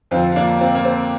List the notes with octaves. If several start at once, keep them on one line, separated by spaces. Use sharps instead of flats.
F2 D3 F3 C4 F4
F4
A#3 D4
C4 F4
A#3
C4